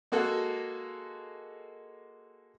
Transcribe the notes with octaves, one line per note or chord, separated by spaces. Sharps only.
G#3 A#3 F#4 A4